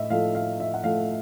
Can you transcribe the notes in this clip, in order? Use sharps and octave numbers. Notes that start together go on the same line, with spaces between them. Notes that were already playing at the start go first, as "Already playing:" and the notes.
Already playing: A2 D#5 E5
A2 F3 A3 F5
F5
E5
F#5
A2 F3 A3 F5